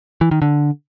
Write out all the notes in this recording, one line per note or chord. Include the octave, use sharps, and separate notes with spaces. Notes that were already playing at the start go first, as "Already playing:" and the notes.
E3
D#3
D3